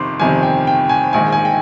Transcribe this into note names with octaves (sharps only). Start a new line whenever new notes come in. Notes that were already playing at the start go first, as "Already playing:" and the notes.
Already playing: G1 F2 C3 D#3 C6 D6
G1 F2 C3 D#3 G#5
G5
G5
G#5
A#1 G#2 D#3 G#5
G#5
G5